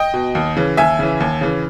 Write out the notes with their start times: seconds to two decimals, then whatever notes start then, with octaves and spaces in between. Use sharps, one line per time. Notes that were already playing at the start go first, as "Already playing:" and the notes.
Already playing: D#5 G5
0.14 B2
0.35 D#2
0.56 C#3 E3
0.77 D#2 E5 G#5
0.99 C#3 E3
1.20 D#2
1.41 C#3 E3